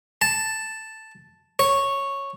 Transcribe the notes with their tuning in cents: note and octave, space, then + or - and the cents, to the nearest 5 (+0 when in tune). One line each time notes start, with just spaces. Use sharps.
A5 +0
C#5 -5